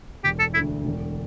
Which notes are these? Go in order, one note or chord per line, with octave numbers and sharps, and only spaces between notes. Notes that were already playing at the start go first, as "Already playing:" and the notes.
E1 G4
A4
D2 D3 A3 E4
E1